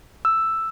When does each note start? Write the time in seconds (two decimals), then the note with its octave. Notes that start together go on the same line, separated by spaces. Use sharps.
0.25 E6